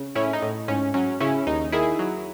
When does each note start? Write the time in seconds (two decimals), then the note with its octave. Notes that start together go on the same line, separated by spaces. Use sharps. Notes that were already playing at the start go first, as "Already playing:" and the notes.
Already playing: C#3
0.15 A2 C#4 E4
0.33 D#4
0.42 A2
0.68 G#2 C#4
0.94 F#3 C#4
1.20 C#3 C#4 E4
1.46 D#2 D#4
1.72 D#3 E4 G#4
1.99 F#3